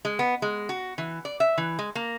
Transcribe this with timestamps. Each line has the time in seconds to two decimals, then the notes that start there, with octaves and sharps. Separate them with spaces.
0.05 G#3
0.19 B3
0.42 G#3
0.69 F#4
0.98 E3
1.25 D5
1.40 E5
1.58 E3
1.79 G#3
1.95 A#3